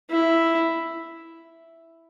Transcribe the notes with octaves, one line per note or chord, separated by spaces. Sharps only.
E4